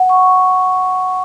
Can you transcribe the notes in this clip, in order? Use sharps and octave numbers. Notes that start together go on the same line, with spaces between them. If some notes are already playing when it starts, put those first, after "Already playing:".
Already playing: F#5
C#6